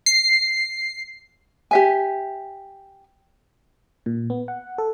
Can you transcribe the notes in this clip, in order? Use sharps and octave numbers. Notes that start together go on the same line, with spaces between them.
C7
G4 E5 G#5
A#2
B3
F#5
A4